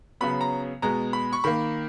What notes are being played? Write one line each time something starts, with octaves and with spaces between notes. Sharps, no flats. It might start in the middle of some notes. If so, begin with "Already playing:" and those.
C#3 F#3 B3 B5
A#5
B2 G#3 B3 A#5
B5
C#6
D#3 A#3 B5